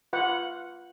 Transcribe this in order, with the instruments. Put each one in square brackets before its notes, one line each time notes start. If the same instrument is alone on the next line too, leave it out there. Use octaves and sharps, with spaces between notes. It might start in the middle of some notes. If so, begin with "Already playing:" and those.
[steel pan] F4 B4 F#5